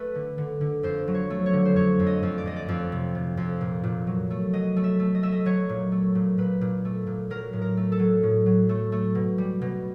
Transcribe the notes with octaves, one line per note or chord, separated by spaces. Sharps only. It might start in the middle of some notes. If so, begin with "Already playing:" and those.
Already playing: A3 B4
D3
D3
D3
F2 C5
F#3
C#5
A3
C#5
D3
C5
F2 C#5
F2
D#5
F2
D5
F2 D#5
D5
F2
C3
C3
F2
A#2
A#2
F#3
A3
F#3 D#5
A3
E5
A3
D#5
A3 E5
D#5
F#3 C#5
A#2
A3
A#2
A#2 B4
A#2
A3
A#2
F#3 A#4
A2
A#4
A3
A4
F#3
A2
F#3
A3
A3
B2
G3
B2